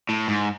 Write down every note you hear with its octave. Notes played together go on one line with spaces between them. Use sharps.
A2
G#2